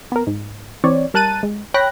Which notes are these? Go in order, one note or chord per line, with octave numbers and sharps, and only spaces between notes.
B3 A#4
G#2
E3 C4 C#5 D5
G3 A#4 A5 F#6 A6 D#7
G#3
C#5 G5 B5 F#6 A#6